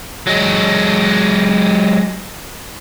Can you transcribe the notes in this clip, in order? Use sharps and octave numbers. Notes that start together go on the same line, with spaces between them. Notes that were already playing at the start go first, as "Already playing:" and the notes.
F#3 G#3